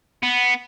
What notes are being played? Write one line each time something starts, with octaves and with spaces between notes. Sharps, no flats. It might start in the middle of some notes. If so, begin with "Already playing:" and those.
B3